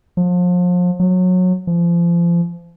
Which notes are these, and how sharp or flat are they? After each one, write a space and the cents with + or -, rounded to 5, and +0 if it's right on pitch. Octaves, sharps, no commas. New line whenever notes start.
F3 +35
F#3 -20
F3 -30